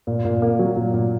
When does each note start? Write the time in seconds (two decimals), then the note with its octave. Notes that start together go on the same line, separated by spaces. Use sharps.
0.07 A#2
0.25 A#2
0.42 A#3
0.59 F#3
0.76 A#2
0.94 A#2